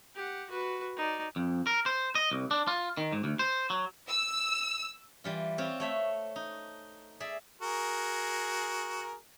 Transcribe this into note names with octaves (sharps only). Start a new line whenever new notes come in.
G4 F#5
F#4 B4
D#4 D5
F2
A#4
C5
D#5
C2
D4
F4
D#3
G#2
D2
C5
F#3
E6
E3 G3 F4
C4 F4 C#5
A3 C#5 E5
D#4
G#4 D5 E5
F#4 G#4 A#4